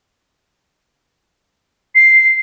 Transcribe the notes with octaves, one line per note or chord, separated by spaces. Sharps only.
C7